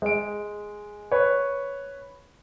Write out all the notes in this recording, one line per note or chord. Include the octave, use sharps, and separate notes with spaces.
G#3 D7
B4 C#5